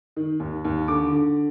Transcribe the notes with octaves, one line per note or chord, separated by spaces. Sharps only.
D#3
D#2
D#2
D3 D6
D3